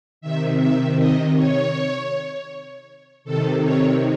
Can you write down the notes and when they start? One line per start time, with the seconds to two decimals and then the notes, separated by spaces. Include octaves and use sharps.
0.21 C3 D#3 E5
0.59 E5
0.97 D#5
1.35 C#5
3.24 C3 D#3 A4
3.63 C#5